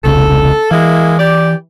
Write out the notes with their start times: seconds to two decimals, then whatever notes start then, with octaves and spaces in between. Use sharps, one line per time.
0.04 E1 C2 C#3 A4
0.71 E3 G#3 A#3 E4
1.19 G4 D5